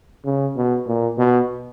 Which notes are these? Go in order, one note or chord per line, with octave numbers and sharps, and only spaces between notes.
C#3
B2
A#2
B2